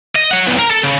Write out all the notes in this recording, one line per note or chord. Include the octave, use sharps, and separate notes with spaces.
D#5
C#5 F#5
B1 E2
A#4
A4
C#3